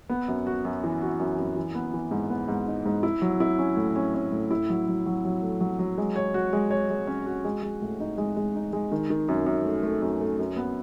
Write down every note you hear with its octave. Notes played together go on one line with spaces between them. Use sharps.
B3
F#2
F#4
F#2
E3
F#4
F#2
F#2
E3
B3
E3
G#2
B3
G#2
D#4
G#2
E4
F#3
E4
C#4
A2
C#4
C#4
A2
E4
F#3
F#3
F#3
F#3
A3
F#3
F#3
G#3
C#5
F#4
G#3
C#5
G#3
C#4
F#4
G#3
G#3
A2
D#4
G#3
G#3
D#4
G#3
D#3
D#3
F#2
F#2
A3
A3
F#2
A3
F#2
B3